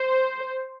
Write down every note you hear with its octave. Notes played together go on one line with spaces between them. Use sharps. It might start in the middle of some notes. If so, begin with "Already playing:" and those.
Already playing: C5